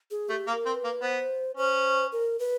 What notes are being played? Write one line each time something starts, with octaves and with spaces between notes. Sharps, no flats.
G#4
A3 G4
A#3 A#4
C4
B4
A#3
B3 C5
C#4 C5
A#4
B4